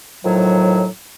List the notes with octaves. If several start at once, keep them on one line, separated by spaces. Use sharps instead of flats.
A2 D#3 F3 F#3